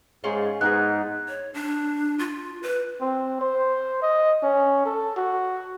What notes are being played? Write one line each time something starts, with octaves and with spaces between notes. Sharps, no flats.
G#2 C#4 F4 G#4
G#2 B3 D#4 G4 G#4 F#6
C#5
D4
F4
B4
C4
C5
D#5
C#4
A4
F#4